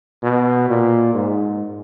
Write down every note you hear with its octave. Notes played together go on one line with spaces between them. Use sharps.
B2
A#2
G#2